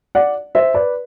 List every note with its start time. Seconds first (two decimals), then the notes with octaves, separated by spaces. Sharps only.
0.15 D5 F#5
0.55 C5 E5
0.74 B4 D5